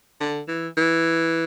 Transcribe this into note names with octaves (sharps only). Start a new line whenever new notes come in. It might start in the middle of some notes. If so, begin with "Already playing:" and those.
D3
E3
E3